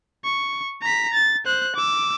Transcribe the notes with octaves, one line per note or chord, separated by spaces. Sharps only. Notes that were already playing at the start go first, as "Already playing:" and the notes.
C#6
A#5 B6
A6
C5 F#6
D6 E6